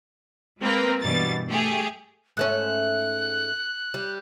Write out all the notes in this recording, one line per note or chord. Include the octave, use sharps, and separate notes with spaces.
G#3 A#3 C4 A#4 B4
G2 B2 E3 G3 A6
A3 G4 G#4
G#2 A3 C#4 F#6
G3